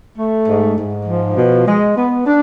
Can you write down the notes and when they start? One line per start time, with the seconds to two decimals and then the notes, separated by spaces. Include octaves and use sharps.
0.17 A3
0.47 G#2
0.77 G#2
1.06 F3
1.36 B2
1.67 G#3
1.96 B3
2.25 D4